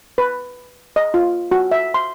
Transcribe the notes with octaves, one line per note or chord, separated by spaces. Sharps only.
B4
D#5
F4
F#4
E5
C6